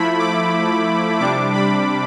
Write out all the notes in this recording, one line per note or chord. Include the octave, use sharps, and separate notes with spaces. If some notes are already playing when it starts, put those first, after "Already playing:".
Already playing: F3 A3 E4 B5
D6
C3 G3 D4 D6
B5